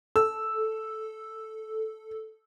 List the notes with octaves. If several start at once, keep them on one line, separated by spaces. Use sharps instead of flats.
A4 E6